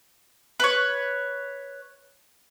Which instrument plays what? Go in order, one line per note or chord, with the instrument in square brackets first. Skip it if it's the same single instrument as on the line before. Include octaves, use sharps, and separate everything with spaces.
[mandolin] B4 C#5